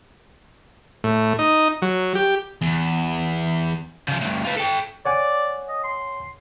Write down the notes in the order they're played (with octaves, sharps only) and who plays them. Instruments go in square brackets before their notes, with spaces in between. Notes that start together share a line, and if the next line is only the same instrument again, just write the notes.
[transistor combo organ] A2
D#4
F#3
G4
[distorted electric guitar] E2
[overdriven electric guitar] C#3 F3
D2 G2
F4 B4
A4 G5
[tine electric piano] C#5 F#5 G#5 [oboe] D5
[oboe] D#5
C6